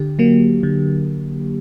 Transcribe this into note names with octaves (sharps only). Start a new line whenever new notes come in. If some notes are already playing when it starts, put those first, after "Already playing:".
Already playing: D3 G4
F#3 A#3
D3